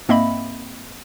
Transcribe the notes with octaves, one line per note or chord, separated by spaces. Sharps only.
G#2 A#3 C4 D#5 E5 B5